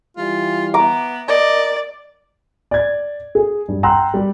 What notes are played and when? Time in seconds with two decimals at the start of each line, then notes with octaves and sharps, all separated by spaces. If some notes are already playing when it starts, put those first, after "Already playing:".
0.17 E3 G3 F4
0.74 B3 A#5 D6
1.28 A#4 D5 D#5
2.71 D5 G#6
3.35 G#4
3.68 G2
3.83 F#5 G5 A#5 C6 E6 F#6
4.14 G3 G4